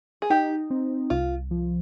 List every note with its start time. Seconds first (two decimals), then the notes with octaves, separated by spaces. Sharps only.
0.22 G#4
0.30 D#4 G4
0.70 C4
1.10 C2 F4
1.51 F3